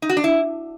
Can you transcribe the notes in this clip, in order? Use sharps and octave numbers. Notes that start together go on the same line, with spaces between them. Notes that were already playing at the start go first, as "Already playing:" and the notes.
D#4
F#4
D4
E4